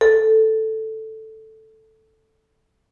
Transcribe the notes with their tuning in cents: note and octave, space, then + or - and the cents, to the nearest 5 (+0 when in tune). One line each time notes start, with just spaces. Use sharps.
A4 +0